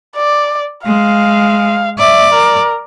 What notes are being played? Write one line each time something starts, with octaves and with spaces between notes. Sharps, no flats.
D5
G#3 F5
D5 E5
A#4